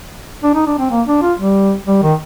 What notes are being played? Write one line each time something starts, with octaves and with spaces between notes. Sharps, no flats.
D4
D#4
D4
C4
A#3
D4
F4
G3
G3
D#3